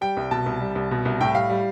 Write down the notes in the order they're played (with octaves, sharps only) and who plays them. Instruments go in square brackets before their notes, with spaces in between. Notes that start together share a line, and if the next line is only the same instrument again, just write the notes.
[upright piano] G3 G5
C2
B2 A5
C2
G3
C2
B2
C2
A2 G5
G3 F5
G3